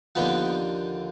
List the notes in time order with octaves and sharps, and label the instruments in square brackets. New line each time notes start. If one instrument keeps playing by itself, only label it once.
[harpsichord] D#2 D3 F3 B3